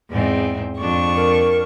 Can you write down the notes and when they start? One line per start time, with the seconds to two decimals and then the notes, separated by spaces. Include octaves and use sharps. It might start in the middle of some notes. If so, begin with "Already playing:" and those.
0.10 E2 G#2 C4
0.79 F2 D4 C#6
1.16 A#4